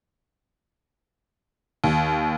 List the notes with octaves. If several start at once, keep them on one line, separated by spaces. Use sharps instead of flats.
D#2